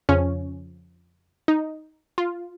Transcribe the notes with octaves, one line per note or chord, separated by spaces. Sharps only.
F2 C#3 F3 C#4
D#4
F4